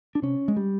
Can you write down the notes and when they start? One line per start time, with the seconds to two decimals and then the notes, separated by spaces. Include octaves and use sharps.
0.15 D4
0.22 C3 C#4
0.48 G#3
0.56 G3